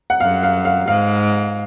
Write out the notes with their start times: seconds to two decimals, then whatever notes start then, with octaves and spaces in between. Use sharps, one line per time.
0.10 F#5
0.20 F#2 F5
0.43 F5
0.65 F5
0.88 G#2 F5